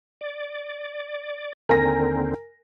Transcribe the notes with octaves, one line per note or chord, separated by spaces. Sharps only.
D5
D#2 D3 C4 A#4 G#5 A#6